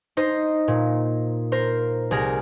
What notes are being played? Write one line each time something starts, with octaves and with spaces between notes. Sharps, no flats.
D#4 C5 D#5
A#2
A#4 C5
C2 G#4 A#4